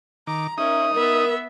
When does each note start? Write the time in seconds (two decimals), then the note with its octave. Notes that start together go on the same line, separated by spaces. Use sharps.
0.27 D#3 A#5 D6
0.58 C#4 D#4 A#4 E5 D#6
0.94 B3 A#4 E5